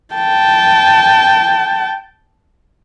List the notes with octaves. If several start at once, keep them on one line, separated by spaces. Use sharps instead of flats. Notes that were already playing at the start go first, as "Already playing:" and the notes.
G5 A5